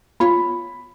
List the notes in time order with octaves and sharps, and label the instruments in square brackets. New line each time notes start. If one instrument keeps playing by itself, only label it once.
[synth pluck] B3 F4 C#5 [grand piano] B5